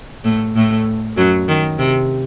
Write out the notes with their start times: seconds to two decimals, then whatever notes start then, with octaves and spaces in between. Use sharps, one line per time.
0.24 A2 A3
0.55 A2 A3
1.17 F#2 F#3
1.48 D#3
1.79 C3